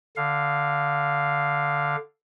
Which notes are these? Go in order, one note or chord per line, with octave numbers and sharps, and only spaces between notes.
D3 F5